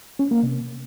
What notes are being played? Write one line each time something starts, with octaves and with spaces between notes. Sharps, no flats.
C#4
A#3
C3